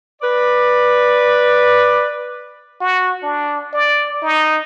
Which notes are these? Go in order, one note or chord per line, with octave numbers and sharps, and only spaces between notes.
B4 D5
F#4
D4
D5
D#4